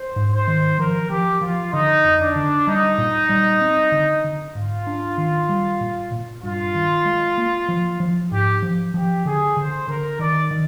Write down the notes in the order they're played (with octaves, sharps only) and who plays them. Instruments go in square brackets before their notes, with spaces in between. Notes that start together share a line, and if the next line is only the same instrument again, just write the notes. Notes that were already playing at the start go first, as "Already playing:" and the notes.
Already playing: [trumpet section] C5
[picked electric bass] G#2
[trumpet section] C5
[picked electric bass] D#3
[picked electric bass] F3 [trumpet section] A#4
[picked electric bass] F3 [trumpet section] G4
[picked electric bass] F3 [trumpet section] F4
[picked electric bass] D3 [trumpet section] D#4
[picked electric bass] F2
[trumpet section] D4
[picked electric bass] D3
[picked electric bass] G3 [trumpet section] D#4
[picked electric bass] A#2
G3
C4
D3
D3
[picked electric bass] G#2 [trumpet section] F4
[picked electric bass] D4
D#3
G3
A#2
A#2
[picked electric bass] G2 [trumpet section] F4
[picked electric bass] D#3
G#3
A#3
F3
F3
[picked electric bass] G#2 [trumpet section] G4
[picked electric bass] F3
[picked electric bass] F3 [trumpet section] G4
[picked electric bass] D3 [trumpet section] G#4
[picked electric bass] D3 [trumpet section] C5
[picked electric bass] D3 [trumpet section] A#4
[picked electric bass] D#3 [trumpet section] D5
[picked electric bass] D#3